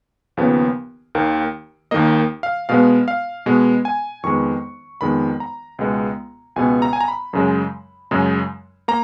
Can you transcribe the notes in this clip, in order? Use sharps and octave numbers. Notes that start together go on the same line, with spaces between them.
D#2 C#3 F3 B3
D#2 D#3 A#3
D#2 D#3 A#3 D#5
F5
B2 G#3 B3 F5
F5
B2 G#3 B3
G#5
F2 D#3 G#3 B3 C#6
F2 D#3 G#3 B3 B5
A#5
C#2 B2 G#3 B3
C#2 B2 G#3 B3 G#5
A#5
G#5
A#5
B5
F#2 C#3 G#3
F#2 C#3 G#3
A#3 A#5